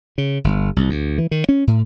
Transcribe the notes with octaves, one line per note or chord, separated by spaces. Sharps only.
C#3
G1
C2
D2
E3
D#3
C#4
A2